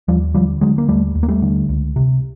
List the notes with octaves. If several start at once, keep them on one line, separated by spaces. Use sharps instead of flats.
D#2 F3 G3
D3 F3 G3
D3 F#3 G#3
A#3
D#2 G3 A3
D#2
A#3
G3 A3
D3
C#2
C3